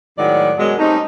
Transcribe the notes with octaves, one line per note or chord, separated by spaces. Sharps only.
A2 D#3 F#3 G#3 D5 F#5
F#2 B2 F#3 G#3
G3 A3 C4 C#4 D#4